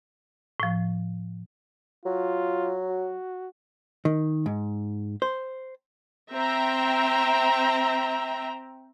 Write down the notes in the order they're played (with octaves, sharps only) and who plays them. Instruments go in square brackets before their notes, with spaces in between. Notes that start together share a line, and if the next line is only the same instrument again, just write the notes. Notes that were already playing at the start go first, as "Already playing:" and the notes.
[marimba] A2 F3
[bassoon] F#3 [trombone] F4
[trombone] F#4
[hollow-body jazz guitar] D#3
G#2
C5
[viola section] C4 E5 G5 A#5